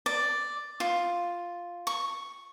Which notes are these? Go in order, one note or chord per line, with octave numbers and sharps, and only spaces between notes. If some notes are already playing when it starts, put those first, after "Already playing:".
D5
F4
C#6